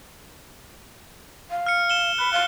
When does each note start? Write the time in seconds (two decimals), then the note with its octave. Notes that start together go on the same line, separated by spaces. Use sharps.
1.50 F5
1.66 F6 C#7
1.90 E7 G7
2.18 B5 F#6
2.33 F5 F#6 G7